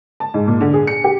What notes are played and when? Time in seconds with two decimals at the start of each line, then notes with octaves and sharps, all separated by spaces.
0.20 A5
0.34 G#2
0.48 A#2
0.61 D3
0.73 G#4
0.87 C#7
1.04 G4